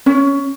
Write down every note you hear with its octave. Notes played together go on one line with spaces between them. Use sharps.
C#4